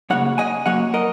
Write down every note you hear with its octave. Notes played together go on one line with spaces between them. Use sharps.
F#2 C#3 A#3 C#5 F#5
D#5 G#5
F#2 F#3 A#3 C#5 F#5
A#4 D#5